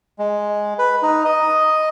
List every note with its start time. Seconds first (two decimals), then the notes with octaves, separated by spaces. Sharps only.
0.19 G#3
0.79 B4
1.02 D#4
1.25 D#5